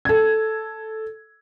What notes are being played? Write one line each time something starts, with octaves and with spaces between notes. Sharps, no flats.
A4 G#6